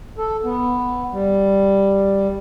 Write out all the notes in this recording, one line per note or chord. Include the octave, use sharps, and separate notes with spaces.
A4
B3
G3